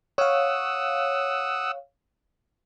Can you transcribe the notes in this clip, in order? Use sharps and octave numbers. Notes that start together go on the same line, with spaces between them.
C#5 F5 F#5 D#6 E6